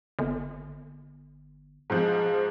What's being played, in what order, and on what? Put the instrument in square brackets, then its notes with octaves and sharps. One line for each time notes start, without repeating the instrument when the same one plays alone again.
[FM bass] G1
[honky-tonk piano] G#2 F3 G#3